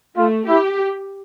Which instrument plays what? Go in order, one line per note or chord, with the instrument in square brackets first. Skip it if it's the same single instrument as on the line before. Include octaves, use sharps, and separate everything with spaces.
[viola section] A3 [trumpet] F4
[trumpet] E4 [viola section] G4